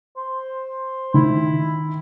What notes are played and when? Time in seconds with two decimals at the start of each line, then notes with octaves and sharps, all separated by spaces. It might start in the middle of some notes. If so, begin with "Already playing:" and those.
0.17 C5
1.14 D#3 E4